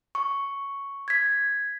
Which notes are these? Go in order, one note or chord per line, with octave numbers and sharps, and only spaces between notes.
C#6
G#6 B6